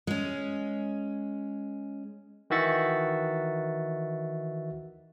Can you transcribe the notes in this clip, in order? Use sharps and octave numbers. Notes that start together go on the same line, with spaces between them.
G#3 C#4
D#3 E3 F#4 E5 A6 C#7